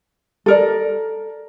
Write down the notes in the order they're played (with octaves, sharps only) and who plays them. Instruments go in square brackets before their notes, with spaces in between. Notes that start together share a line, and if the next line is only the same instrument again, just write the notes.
[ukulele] A4 A#4 D5